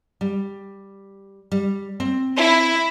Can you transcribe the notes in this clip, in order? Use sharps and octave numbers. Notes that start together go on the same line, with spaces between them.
G3
G3
C4
E4